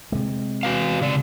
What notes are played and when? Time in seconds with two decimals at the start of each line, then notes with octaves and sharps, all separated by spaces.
0.12 C3 G#3
0.63 F#4 B4 F5
1.01 C#3 D5